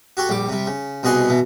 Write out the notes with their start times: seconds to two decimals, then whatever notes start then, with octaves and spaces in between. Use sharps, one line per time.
0.17 F#4 G4 A4
0.29 A#1 G3 D6
0.49 C3 G3
0.67 C#3
1.03 C2 B2 G#4 D#5 F#5 C6
1.29 B2 E3